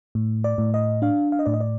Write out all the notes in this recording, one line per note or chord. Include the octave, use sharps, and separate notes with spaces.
A2
D5
A2
D#5
D4 F5
F5
D#5
A2 D5
D#5
D5